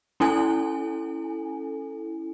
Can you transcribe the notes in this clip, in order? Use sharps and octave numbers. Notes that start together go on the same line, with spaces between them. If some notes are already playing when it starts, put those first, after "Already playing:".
C#4 E4 A4 G#5